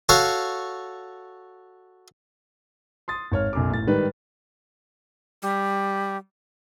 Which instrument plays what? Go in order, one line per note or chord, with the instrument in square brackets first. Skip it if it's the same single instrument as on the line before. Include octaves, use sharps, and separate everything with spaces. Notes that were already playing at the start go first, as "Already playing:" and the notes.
[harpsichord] F#4 A4 C#5 F5 F#5
[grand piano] C6 D#6 A6
G#1 C#5 F6
B1 F#2 D6
A1 A6
G#2 D#3 G3 B4
[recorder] G3